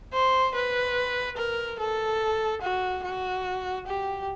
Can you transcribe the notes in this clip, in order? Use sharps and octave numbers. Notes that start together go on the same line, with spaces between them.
C5
B4
A#4
A4
F#4
F#4
G4